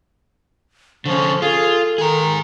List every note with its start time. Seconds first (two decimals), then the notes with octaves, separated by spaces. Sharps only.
1.06 D3 F3 C#4 C#6
1.42 F4 G#4 A4
1.98 D#3 G#4 A#5